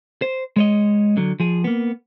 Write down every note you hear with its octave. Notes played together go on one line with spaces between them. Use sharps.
C5
G#3 C#5 D#5
D3 F#3
F3 G#4
A#3 B3